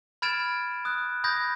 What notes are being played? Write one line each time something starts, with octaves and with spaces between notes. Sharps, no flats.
B5 F6 G#6 A6 D7 E7
D#6 F#6
B5 D#6 G6 G#6 A#6